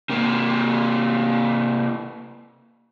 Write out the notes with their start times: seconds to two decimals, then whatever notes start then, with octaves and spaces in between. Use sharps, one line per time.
0.09 C3 A#3